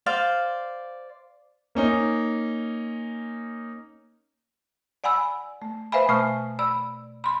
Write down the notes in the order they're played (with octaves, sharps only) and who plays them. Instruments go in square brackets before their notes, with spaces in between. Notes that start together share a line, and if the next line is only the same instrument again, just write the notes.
[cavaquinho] C5 D5 F5
[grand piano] A#3 C#4 D#4
[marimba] D5 F#5 G#5 B5 E6
A3
B4 C5 E5 F5 G#5 B5
B2 A3 G#5 C#6 F6
D5 B5 E6
B5 C6